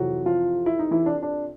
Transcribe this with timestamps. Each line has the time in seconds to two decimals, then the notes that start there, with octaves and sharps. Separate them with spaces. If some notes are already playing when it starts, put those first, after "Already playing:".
Already playing: F2 C3 E3 F#3 F#4
0.26 F3 F4
0.66 E4
0.79 D#4
0.91 E3 E4
1.06 D4
1.22 D4